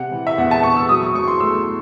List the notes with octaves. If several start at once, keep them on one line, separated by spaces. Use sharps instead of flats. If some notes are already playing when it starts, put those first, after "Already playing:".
Already playing: C3 F#5
E3
E5
E2 F#5
A5
E2 C#6
E6
F#3 D#6
C#6
F#3 C#6
C6
A3 E6